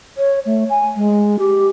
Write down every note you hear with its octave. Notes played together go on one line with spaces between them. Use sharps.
C#5
A3
G#5
G#3
G4